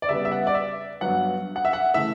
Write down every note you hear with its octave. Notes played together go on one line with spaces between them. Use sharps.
D5
C#3 G3 B3 E5
E5
F#5
D5
E5
G2 F#3 B3 F#5
F#5
E5
F#5
C#3 E3 A3 E5